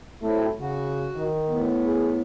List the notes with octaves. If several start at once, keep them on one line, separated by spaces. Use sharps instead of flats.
F#3 A3 C4 E4
C#3 F#4
D#3
A2 B3
G#4